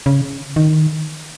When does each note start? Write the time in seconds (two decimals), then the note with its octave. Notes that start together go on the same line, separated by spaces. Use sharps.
0.06 C#3
0.56 D#3